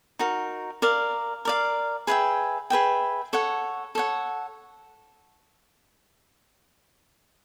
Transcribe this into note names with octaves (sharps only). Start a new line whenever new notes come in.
D#4 F#4 A#4
A#4 D5 F5
A#4 D5 F5
G#4 B4 E5 G5
G#4 B4 E5 G5
A4 C#5 F#5
A4 C#5 F#5